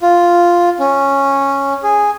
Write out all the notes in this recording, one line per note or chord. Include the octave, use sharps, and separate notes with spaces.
F4
C#4
G#4